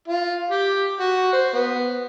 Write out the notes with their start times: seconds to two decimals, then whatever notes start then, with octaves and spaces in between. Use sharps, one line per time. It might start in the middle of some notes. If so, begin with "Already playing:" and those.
0.08 F4
0.51 G4
1.00 F#4
1.33 C5
1.53 B3